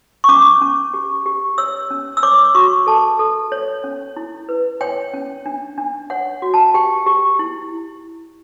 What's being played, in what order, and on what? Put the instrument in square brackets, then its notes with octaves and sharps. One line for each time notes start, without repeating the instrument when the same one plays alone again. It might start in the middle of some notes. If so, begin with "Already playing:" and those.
[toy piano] C#6
C#4 D6
C#4
G4
G4
C#5 E6
C#4
E6
C#5 D6
F#4 C#6
A4 A5
A4
C#5
C#4
E4
B4
C#5 G5
C#4
D4
D4
C#5 F#5
F#4
A5
G4 G5
G4
E4